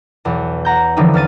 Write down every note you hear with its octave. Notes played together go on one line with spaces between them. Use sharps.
B1 E2
F#5 A#5 G6
D3 E3 F3 G3 C#4 D#4
E2 F6 A6 D#7